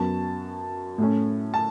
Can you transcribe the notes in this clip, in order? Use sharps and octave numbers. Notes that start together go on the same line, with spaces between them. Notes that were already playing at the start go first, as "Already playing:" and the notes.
Already playing: F#2 F#3 B3 A5
A2 A3 C#4
A5